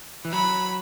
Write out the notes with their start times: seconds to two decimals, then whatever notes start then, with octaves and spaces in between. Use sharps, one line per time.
0.25 E3
0.33 F#3 B5